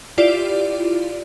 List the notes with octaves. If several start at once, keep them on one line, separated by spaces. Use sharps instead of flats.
E4 F4 G4 D5